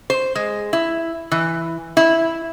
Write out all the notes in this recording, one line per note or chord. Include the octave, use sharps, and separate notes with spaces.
C5
G#3
E4
E3
E4